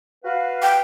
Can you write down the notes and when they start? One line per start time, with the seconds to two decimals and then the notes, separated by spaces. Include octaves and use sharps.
0.24 F#4 B4 F5
0.62 G5